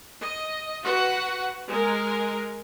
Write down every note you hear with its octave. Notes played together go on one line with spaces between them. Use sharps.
D#5
F#4 B4 F#5
G#3 A#4